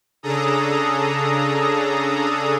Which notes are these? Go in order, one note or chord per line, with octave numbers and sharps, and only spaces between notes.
C#3 D4 G#4 A4 A#5 D#6